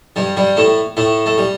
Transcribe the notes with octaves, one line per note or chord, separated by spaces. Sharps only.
G2 G3
G2 G3
A2 A3
A2 A3
A3
G3